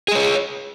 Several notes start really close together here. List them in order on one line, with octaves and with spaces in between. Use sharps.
G#4 D#5 C#5